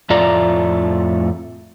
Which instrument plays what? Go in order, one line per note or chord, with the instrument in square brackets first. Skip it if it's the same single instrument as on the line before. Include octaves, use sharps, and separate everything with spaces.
[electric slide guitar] F2 A2 A3 F4 D5 A#5